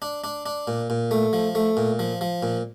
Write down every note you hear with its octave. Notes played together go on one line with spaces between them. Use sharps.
D4
D4
D4
A#2
A#2
A3
F3
A3
A#2
F3
F3
A#2